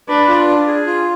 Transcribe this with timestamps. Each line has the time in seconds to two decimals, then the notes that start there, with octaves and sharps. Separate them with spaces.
0.08 D4 B4
0.28 F4
0.48 D4
0.67 G#4
0.86 F4